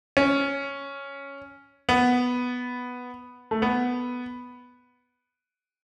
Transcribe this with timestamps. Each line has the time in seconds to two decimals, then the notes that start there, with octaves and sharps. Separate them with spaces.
0.17 C#4
1.89 B3
3.51 A3
3.62 B3